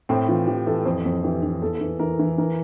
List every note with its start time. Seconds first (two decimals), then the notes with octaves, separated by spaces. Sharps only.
0.09 A2 C4
0.28 E3 F4
0.47 E3 G4
0.66 E3 A4
0.85 F2 C5
1.05 F2
1.23 E3 G4
1.43 E3
1.62 E2 A4
1.81 E3
1.99 E3 A#4
2.19 E3
2.38 E3 A#4